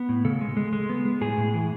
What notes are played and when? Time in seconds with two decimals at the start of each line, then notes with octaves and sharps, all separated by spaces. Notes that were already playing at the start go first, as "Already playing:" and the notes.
Already playing: B3
0.09 A2
0.25 C#3 A4
0.41 G#3
0.57 G#3
0.73 G#3
0.89 B3
1.05 G#3
1.21 A2 G#4
1.38 A2
1.54 E3